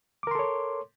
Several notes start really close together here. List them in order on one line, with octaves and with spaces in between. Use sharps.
D6 A#4 C6 A4 C#5